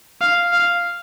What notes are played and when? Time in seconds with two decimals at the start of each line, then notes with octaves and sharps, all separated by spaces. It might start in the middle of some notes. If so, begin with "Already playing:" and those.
0.21 F5
0.53 F5